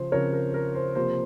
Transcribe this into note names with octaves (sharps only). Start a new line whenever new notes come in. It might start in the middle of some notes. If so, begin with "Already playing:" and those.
Already playing: C#3 F3 C5
C#3 F3 C4 A#4 C#5
A#4
A#4
C5
C3 F3 A#3 C5